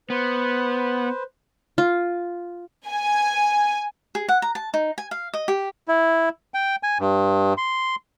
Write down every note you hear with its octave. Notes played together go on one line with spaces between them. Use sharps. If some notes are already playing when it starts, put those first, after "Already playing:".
B3 B4 C5
F4
G#5
G#4
F#5
A#5
A5
D#4
G#5
F5
D#5
G4
E4
G5
G#5
G2
C6